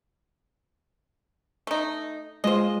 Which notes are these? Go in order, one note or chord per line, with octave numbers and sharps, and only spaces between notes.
A3 D#4
G#3 F4 C5 D#5